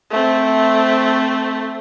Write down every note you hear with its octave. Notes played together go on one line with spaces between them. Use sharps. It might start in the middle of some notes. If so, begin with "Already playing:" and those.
A3 C4